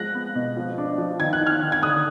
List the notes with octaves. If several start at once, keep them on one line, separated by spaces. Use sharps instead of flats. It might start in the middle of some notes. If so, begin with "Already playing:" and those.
Already playing: F3 G#3 F#6 A#6
B3
B2
F3
D4
F3
D#3 G#6
F#6
D#4
F6 G#6
D#3
G#6
D3 D#6 F#6